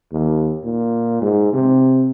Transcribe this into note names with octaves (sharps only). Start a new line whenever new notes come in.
D#2
A#2
G#2
C3